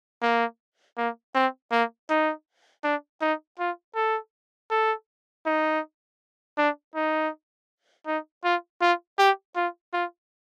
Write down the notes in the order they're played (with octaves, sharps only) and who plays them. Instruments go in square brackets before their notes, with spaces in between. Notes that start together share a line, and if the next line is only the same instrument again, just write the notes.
[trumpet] A#3
A#3
C4
A#3
D#4
D4
D#4
F4
A4
A4
D#4
D4
D#4
D#4
F4
F4
G4
F4
F4